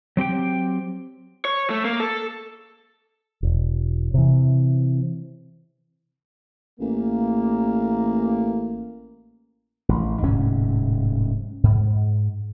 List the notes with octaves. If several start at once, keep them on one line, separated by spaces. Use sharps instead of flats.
F#3 C4 G4 G5
C#5
A3
A#3
A4
E1
C3 E3
A1 A#3
A1
D1 G#2 C3 C#4
G#2